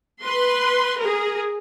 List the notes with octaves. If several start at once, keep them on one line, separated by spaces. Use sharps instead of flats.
B4 C6
G#4 A#4